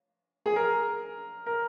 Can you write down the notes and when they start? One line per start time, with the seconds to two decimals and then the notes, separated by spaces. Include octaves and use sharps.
0.46 G#4
0.56 A#4
1.46 A#4